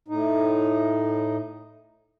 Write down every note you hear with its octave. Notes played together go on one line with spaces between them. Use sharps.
A2 D#4